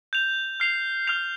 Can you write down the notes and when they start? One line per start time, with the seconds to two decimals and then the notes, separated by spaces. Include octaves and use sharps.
0.13 G6 F7
0.60 F6 C7 F7
1.07 F6 C7 F7